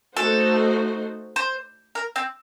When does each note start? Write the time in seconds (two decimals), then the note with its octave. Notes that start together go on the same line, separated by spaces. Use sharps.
0.16 A3 D#4 F#4 A4 C5
1.36 C5
1.95 A#4
2.16 C4